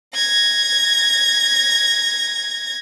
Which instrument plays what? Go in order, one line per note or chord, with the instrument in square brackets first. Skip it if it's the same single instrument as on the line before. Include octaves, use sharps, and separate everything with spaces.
[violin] G#6 A#6